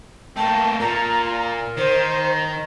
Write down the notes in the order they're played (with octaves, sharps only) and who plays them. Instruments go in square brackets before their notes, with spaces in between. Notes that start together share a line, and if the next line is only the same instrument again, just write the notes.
[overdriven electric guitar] A3 A#3 [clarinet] G5 [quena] A5
[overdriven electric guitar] A#2 [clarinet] A#4 [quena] A#5
[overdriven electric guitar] D#3 [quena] C5